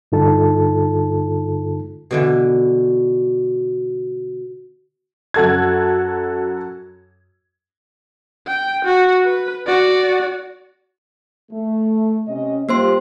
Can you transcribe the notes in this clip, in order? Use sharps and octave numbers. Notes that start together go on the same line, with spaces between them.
G2 D3 D#4 F4 A4 A5
B2 D3 E3
F#2 F#4 A4 G#6
G5
F#4
B4
F#4 D5
A3
C3 C#4 D#5
G3 A#3 F4 G4 C5 C6